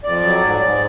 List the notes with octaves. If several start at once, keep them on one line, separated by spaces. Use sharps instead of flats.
F2 D5
F#3
G#2
G#2